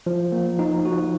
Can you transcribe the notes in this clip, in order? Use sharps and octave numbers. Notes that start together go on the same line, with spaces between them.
F3
A#3
D#4
F#4